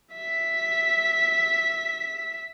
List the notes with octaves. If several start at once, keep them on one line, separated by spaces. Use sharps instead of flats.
E5 B6